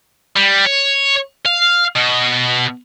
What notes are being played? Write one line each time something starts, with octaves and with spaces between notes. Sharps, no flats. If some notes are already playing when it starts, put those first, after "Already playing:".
G3
C#5
F5
B2